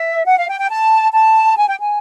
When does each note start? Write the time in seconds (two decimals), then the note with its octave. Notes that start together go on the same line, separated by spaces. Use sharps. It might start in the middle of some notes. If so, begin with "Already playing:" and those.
Already playing: E5
0.26 F#5
0.38 F5
0.49 G5
0.59 G5
0.69 A5
1.12 A5
1.56 G#5
1.67 G5
1.79 G#5